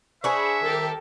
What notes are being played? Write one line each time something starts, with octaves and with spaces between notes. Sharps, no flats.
D4 G#4 C5 E5 B5 C#6
C2 D#3 G4 A4 A#4